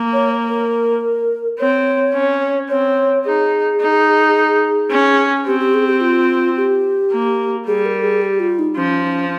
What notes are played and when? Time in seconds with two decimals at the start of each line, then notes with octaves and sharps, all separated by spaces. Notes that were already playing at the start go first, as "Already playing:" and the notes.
Already playing: A#3
0.13 C#5
0.49 A#4
1.60 C4 C#5
2.14 C#4
2.69 C4 C#5
3.25 D#4 G#4
3.80 D#4
4.90 C#4
5.46 C4 G4
5.60 G4
5.74 G#4
5.87 G4
6.01 F4
6.57 G4
7.11 A#3
7.67 G3 G#4
7.86 A#4
8.03 G#4
8.22 G4
8.40 F4
8.59 D#4
8.77 F3 C#4